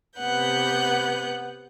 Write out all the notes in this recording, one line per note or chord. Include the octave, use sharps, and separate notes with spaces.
C3 B3 B4 F#5 G6